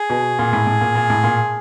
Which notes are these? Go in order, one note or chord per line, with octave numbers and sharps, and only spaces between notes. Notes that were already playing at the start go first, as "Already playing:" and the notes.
Already playing: G#4
B2
A#2
A2
A2
A#2
A#2
A2
A#2